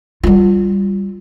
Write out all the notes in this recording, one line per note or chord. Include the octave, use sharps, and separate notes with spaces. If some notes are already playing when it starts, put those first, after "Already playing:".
G3 F4